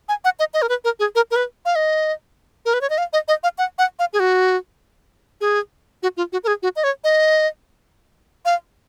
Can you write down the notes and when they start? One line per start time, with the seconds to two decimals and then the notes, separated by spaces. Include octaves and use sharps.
0.09 G#5
0.25 F#5
0.39 D#5
0.54 D#5
0.62 A#4
0.69 B4
0.84 A#4
0.99 G#4
1.15 A#4
1.31 A#4
1.36 B4
1.65 F5
1.76 D#5
2.65 A#4
2.74 B4
2.81 C#5
2.90 D#5
2.98 F5
3.13 D#5
3.28 D#5
3.43 F5
3.58 F#5
3.78 F#5
3.99 F5
4.13 G#4
4.20 F#4
5.41 G#4
6.03 F#4
6.17 F4
6.33 F#4
6.44 A#4
6.47 G#4
6.63 F#4
6.76 D#5
6.84 C#5
7.04 D#5
8.45 F5